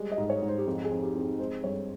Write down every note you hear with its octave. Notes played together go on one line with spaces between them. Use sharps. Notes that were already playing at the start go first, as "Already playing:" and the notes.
Already playing: G3 G#3
D#5
G#2
C#5
G#2
C5
G4
F2 G#4
G#4
F2
G4
F2
G#4
G#3 C5
G2 C#5